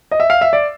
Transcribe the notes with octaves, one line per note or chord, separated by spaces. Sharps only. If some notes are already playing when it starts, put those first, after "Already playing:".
D#5
E5
F5
E5
D5